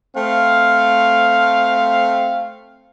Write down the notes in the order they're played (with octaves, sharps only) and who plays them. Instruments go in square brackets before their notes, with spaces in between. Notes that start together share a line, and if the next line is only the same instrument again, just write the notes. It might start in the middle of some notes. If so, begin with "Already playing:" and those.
[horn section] A3 C4 F5